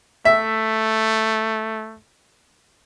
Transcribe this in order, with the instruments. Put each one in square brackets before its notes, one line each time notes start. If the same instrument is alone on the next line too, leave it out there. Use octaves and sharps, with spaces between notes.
[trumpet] A3 [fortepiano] E5